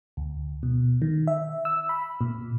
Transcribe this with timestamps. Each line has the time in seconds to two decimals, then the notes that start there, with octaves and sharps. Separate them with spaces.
0.17 D2
0.63 B2
1.02 D#3
1.27 E5
1.65 E6
1.89 B5
2.21 A#2